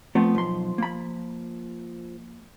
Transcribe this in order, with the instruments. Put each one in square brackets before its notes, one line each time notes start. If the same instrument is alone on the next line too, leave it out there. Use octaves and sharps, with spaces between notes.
[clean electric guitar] F3 [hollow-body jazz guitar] A3 B3 C4
[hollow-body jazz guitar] B1 C6
A#3 B5